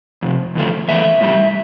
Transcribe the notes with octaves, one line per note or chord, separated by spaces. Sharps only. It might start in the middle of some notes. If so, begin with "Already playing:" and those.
F2 C3
E2 D3 F3 A3
E2 E3 A3 E5
A2 G3